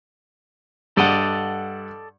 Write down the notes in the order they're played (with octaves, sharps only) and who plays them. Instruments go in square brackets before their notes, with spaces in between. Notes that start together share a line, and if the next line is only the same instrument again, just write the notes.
[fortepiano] G2 F#5 [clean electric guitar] A4 D5 D#5